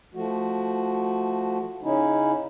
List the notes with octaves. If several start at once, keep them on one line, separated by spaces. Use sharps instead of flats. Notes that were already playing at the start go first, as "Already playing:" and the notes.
F3 A3 F#4
C#3 C#4 D#4 E4